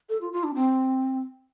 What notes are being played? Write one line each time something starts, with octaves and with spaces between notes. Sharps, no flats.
A4
F4
F4
D4
C4